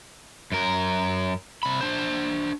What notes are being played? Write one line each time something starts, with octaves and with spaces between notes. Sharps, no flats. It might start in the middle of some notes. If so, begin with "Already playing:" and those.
F#2 A#4
C3 B5
D4 C5